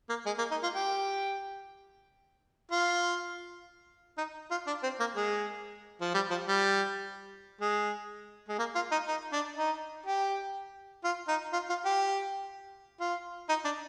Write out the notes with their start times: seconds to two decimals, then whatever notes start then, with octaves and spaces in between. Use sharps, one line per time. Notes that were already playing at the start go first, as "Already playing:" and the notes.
0.09 A#3
0.26 G#3
0.38 A#3
0.51 D#4
0.63 F4
0.75 G4
2.71 F4
4.18 D#4
4.51 F4
4.67 D4
4.83 C4
5.00 A#3
5.16 G#3
6.01 F3
6.14 G3
6.30 F3
6.47 G3
7.61 G#3
8.49 G#3
8.59 A#3
8.75 F4
8.91 D#4
9.08 D#4
9.32 D4
9.57 D#4
10.06 G4
11.04 F4
11.28 D#4
11.53 F4
11.69 F4
11.85 G4
13.00 F4
13.49 D#4
13.65 D4